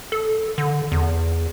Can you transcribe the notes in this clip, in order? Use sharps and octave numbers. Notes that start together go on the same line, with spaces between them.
A4
D3
E2